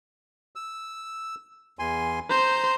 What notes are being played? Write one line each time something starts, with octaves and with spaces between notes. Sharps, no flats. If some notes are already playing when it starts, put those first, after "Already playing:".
E6
E2 G#5 C6
C5 A#5 G6